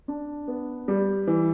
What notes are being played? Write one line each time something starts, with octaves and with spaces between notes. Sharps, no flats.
D4
B3
G3
E3